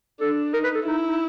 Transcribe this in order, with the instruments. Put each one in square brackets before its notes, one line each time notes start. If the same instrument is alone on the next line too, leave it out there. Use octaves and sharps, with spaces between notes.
[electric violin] D4 [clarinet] A4
[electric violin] D#4 [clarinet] A#4
[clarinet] B4
A4
[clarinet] D#4 [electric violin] E4
[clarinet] D#4